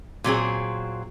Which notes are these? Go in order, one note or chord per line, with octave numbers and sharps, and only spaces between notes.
A#2 F#3 C4 G#4